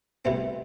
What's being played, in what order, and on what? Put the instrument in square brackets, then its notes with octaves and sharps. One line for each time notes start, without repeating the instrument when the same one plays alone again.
[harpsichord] C2 B2 A3 C4